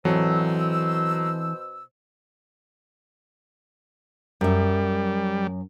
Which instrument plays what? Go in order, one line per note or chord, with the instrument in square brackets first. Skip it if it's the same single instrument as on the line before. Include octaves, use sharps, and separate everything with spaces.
[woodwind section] B2 C5 E6 [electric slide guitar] E3 C4 A4 [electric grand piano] F#3
[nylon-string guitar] F#2 E5 [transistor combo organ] G3